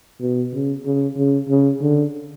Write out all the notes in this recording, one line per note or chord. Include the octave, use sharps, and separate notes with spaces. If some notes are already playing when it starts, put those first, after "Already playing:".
B2
C#3
C#3
C#3
C#3
D3